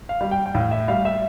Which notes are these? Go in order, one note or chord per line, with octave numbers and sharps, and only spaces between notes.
F5
G3
G5
G5
A2 F5
E5
G3 F5
E5